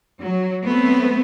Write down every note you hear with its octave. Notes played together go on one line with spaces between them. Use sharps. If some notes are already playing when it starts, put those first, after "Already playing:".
F#3
A3 B3 C4